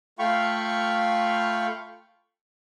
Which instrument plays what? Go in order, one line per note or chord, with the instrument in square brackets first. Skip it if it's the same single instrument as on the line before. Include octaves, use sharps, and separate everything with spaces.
[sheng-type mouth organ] A3 F4 F5 G5 B5 C#6